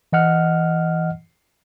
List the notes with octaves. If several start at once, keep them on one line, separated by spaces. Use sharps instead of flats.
E3 D#5 F#5 F6